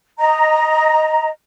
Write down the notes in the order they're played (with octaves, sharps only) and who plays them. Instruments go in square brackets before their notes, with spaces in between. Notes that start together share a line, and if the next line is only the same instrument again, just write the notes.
[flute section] D#5 A#5